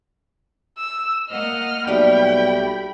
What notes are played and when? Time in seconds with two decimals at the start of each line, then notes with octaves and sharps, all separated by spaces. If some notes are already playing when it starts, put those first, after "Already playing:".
0.78 E6
1.31 A#3 D#5 F#5 F6
1.87 B1 G3 A3 G5 B5